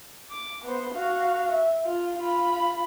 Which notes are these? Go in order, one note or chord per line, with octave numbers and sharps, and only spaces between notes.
D6
B3 C5
F#4 F5
E5
F4
F4 B5